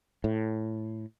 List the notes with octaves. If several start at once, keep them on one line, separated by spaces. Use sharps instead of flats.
A2